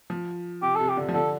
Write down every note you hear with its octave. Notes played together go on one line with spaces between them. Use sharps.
F3
C3 G4
C3 A4
G4
D3
F3
D3 A4